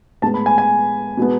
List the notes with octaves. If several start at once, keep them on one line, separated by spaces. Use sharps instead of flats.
A2 G#3 B3 A5
B5
G#5
G#5
B2 G#3 B3